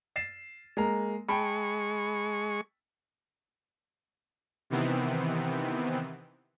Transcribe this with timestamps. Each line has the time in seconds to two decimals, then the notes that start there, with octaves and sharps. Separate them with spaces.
0.16 A6 C7 E7
0.77 G#3 A#3 A#5
1.29 G#3 G5 A5 B5 C#6
4.70 C3 D#3 E3 B3 C4